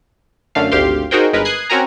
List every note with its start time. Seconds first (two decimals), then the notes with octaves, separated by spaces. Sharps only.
0.55 F#2 D3 A3 F5
0.72 G#1 D2 G4 F5 C6
1.11 D#4 F#4 G#4 A#4 C5 G5
1.33 G1 G#3 A#4 B4
1.45 D#6 F#6 G#6 C7
1.70 C4 C#4 F#4 A#4 G#5 A#5